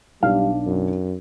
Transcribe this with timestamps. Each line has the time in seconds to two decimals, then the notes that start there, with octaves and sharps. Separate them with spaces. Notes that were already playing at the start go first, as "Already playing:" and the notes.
0.23 B1 G3 D4 F5
0.66 F#2